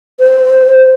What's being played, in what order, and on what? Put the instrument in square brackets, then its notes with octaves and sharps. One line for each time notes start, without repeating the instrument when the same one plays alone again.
[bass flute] C5